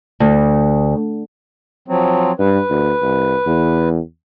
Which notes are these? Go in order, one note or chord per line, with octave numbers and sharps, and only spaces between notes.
D2
F3 F#3 C4
G2 B4
D2
C2
E2